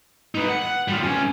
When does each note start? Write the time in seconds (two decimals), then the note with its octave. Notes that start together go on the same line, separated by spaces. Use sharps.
0.35 D#4 B4
0.49 F#5
0.62 F#5
0.88 G3 F4
1.03 B1 C#4